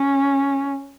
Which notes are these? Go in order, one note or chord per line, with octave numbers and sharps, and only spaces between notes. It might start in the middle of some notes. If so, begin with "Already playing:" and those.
Already playing: C#4